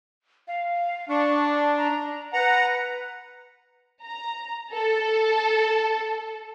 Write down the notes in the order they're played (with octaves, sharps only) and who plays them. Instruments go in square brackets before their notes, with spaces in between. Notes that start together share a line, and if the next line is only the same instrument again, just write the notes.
[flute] F5
[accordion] D4 [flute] C#6
[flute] A#5
[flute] B4 [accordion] F#5 A#5
[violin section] A#5
A4